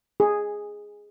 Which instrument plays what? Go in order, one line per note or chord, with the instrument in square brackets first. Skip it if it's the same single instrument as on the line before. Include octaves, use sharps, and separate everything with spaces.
[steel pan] G#4